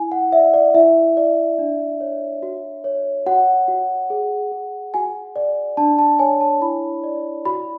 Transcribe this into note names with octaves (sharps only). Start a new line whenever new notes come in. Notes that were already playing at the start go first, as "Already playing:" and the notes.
Already playing: E4 G#5
F#5
D5 E5
D5
E4 E5
D5
D4
C#5
F#4
C#5
F#4 F#5
F#4
G#4
G#4
F#4 G#5
D5
D4 A5
A5
C#5 G#5
A5
E4 B5
D5
F#4 B5